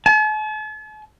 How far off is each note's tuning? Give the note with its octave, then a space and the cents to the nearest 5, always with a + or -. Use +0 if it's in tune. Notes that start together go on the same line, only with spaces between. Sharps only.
A5 -45